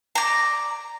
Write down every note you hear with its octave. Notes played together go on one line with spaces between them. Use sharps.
D5 A#5